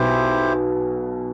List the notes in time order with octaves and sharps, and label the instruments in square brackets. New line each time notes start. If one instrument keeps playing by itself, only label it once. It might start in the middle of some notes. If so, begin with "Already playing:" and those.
Already playing: [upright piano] B1 B2 [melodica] E4 G4 C5